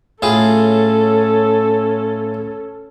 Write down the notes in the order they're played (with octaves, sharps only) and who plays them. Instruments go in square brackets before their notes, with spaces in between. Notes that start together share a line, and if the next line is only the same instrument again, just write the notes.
[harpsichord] A2 F4 G#4 [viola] C#4 A4